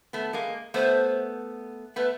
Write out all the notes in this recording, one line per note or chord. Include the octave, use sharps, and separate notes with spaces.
A3 B3
G#3 A#3
A3 B3 C5
A3 B3 B4